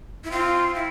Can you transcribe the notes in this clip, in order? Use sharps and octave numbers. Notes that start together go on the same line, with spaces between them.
E4
C4 F4
E4